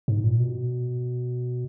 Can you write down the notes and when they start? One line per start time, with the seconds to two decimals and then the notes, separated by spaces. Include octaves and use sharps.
0.08 G#2
0.24 A#2
0.39 B2